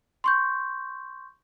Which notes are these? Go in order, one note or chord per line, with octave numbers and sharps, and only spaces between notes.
C6 C#6 G6